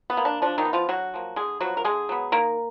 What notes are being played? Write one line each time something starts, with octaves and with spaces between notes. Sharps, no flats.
B3
A#3
D4
F3 D4
D#3 D#4
B3
F3 F4
D3 F#3 F#4
F3 A#3
D3 G#3 G#4
F3 F#3 B3 F#4
A#4
D3 G#3 G#4
F#3 B3
D#3 A#3 A#4